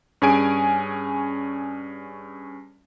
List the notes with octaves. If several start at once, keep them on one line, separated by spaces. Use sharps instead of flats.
G2 C#4 G#4 G#5 D7